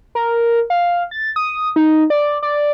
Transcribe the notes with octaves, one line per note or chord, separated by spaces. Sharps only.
A#4
F5
A6
D#6
D#4
D5
D5